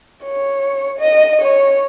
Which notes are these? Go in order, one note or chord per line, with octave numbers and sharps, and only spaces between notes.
C#5
D#5
C#5